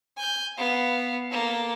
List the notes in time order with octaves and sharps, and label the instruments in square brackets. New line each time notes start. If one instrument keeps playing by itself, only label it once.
[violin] G#5 G6
B3 F5
A#3 A4